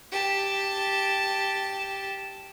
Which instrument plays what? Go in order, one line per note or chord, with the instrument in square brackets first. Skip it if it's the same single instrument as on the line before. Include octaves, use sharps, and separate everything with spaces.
[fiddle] G4 A5